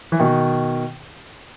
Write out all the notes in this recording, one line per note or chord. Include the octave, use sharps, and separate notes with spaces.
E3
B2 D#3